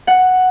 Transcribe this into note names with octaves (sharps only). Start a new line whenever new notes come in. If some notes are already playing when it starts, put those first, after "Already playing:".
F#5